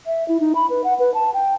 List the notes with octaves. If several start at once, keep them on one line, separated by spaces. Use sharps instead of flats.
E5
E4
D#4
B5
B4
F#5
B4
A5
G5